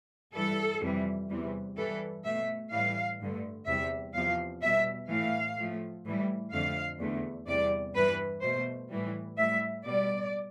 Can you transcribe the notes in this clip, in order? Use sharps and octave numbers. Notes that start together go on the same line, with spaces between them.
G2 E3 G3 A4
F2 C3 E3 G3
E2 C3 E3 G3
G2 E3 G3 A4
B2 A3 E5
A2 E3 G3 F5
G2 D3 A3
E2 C3 G3 E5
E2 C3 F3 F5
B2 G3 E5
A2 E3 A3 F5
A2 F3 A3
A2 E3 G3
F2 D3 A3 F5
E2 D3 A3
E2 C3 G3 D5
G2 E3 G3 B4
B2 A3 C5
A2 E3 G3
A2 G3 E5
B2 G3 D5